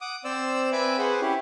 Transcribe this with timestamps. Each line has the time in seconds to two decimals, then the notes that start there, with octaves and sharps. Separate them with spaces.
0.01 F#5 D6 D#6
0.24 C4 C5 D5 E6
0.72 C4 B4 E5 G#5 B5 D6
0.98 G#4 B4 C5 F#5
1.21 C#4 E4 G4